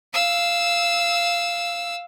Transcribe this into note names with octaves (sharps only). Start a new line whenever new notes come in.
F5 E6